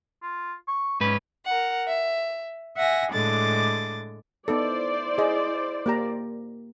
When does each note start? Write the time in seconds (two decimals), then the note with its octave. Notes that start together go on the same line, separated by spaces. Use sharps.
0.22 F4
0.68 C#6
1.01 G#2 C#4 B4
1.45 A#4 F#5
1.87 E5
2.77 E5 F#5 G#5 A#6
3.11 A2 D3 G#3 D6 A6
4.48 B3 D#4 E4 A4 C5 D5
5.18 G#4 D#5
5.86 A#3 G4 A#5